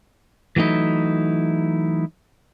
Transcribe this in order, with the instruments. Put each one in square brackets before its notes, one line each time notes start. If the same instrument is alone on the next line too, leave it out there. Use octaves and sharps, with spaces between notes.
[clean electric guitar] E3 F#3 A3 D#4 E4